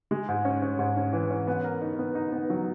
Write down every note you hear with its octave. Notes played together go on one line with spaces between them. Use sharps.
G#3
G#2
C#4
C#4
G#2
C#4
E3
C#4
B3
A#4
D#4
B3
D#4
B3
F#3